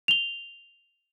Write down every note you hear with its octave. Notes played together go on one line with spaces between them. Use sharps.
F7 G7